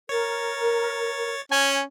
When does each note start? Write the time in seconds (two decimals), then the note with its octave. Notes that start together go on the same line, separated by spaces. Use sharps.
0.09 A#4 C#5 A6
1.52 C#4 G#5